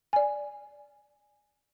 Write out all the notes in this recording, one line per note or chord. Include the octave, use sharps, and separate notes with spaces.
D5 G#5